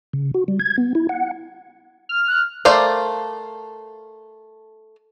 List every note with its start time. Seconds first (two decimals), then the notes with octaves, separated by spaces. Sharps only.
0.13 C#3
0.34 F#4
0.48 G3
0.60 G#6
0.78 B3
0.95 E4
1.09 F#5
2.09 F6
2.28 F#6
2.65 A3 A#4 C5 D5 F5